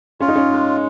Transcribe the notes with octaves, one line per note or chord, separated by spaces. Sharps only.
C#4 F4
D#4
C#4
G#3